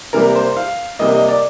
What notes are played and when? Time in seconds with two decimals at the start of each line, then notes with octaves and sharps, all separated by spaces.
0.13 C3 G3 A#3 A#4
0.35 C5
0.56 F5
0.99 C3 G3 A#3 D#5
1.15 D#5
1.28 D5